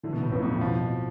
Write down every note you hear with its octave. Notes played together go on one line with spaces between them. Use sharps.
D3 E3
B2
A2 B3
F2 B4
F2
A2 B3
B2 F3
B2